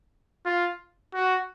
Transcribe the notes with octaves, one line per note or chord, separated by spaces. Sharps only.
F4
F#4